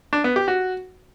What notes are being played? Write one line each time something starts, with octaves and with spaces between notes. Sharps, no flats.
D4
B3
G4
F#4